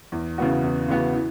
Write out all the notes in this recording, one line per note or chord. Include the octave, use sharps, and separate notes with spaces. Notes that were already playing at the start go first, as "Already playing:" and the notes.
E2
C#3 E3 B3 F#4
E2
C#3 E3 B3 F#4
E3